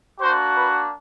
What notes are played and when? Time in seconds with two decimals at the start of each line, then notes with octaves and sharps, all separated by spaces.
0.20 A#3 D4 F#4 C5
0.56 B4